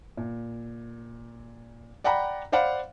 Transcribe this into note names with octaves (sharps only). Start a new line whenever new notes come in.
A#2
D5 F#5 G5 A#5 B5
C5 D5 F5 F#5 B5